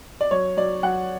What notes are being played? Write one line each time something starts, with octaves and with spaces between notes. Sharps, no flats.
D5
F#3 C#5
F#3 D5
F#3 F#5